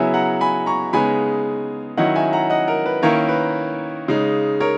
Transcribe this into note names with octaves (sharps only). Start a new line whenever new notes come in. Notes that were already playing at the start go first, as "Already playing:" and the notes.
Already playing: C#3 F#3 B3 E4 E5 G#5
F#5 A#5
G#5 B5
A#5 C#6
C#3 G#3 B3 D#4 G#5 B5
D#3 F#3 C#4 E4 D#5 F#5
E5 G#5
F#5 A#5
D#5 F#5
A#4
B4
D#3 A#3 C#4 E4 A#4 C#5
B4
C#3 G#3 D#4
A#4 C#5